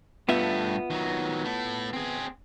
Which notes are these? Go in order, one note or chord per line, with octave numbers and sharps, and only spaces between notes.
G2 A3 B3 F4 E5
D#3 F#3
A3 E4
C4 G#4